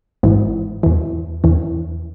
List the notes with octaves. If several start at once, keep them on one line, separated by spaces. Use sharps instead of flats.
G#1 G#2 E3
E2 E3
E2 E3